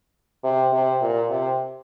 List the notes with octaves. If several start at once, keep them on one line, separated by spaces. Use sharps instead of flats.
C3
C3
A#2
C3